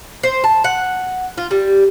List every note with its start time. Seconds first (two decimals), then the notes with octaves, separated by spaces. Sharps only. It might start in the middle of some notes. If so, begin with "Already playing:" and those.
0.23 C5
0.44 A5
0.64 F#5
1.38 F4
1.51 G3